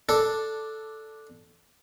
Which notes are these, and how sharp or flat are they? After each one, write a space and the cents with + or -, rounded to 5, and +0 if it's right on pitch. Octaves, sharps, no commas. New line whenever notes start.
D4 +0 A4 +0